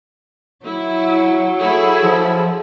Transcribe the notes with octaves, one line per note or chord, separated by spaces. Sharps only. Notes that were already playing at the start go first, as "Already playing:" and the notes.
F#3 E4
E4 G#4 A4
F3